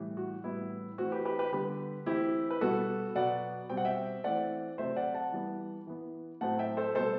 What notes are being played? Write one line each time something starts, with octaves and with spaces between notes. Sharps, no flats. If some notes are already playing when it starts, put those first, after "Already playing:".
Already playing: A2 E3 G3
F#4
A2 E3 G3 B3 E4
E3 A3 C4 F#4
G4 B4
G4 B4
G4 B4
D3 G3 B3 G4 B4
E3 A3 C4 E4 G4
B4
B2 G3 B3 F#4 A4
B2 F#3 B3 D5 F#5
B2 G3 C4 G5
F#5
E5 G5
E3 A3 C4 D5 F#5
C3 F#3 A3 C4 C5 E5
D5 F#5
F#5 A5
E3 G3 B3
E3 B3
A2 F#3 A3 C4 F#5 A5
E5 G5
A4 C5
B2 G3 B3 A4 C5